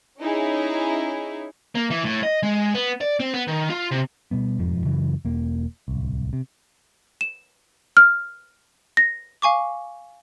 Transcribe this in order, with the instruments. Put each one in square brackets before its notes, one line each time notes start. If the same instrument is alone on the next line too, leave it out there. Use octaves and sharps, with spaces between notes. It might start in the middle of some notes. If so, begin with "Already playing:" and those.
[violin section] C#4 D#4 E4 G#4
[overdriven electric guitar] A#3
E3
A2
D#5
G#3
B3
D5
C4
B3
D#3
F4
C3
[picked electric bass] B2 G3 B3
E1 F2 G#2 F3
F#2 C#3 E3 F#3
E1 A#3
D1 C2
C3
[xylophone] E7
F6
A#6
F5 G#5 C#6 D6